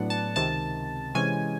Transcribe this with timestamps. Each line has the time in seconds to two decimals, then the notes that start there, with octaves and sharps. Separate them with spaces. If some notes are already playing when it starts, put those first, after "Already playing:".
Already playing: A2 F#3 B3 D4 F#5
0.10 A5
0.36 C#2 C3 D#3 A5
1.15 C3 E3 G#3 C#4 G#5